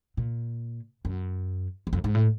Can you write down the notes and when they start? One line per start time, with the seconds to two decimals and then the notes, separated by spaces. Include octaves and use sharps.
0.17 A#2
1.05 F#2
1.87 E2
1.93 F2
2.04 G#2
2.15 A2